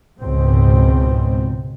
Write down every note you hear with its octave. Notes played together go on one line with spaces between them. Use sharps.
C#2 G#2 B2 C4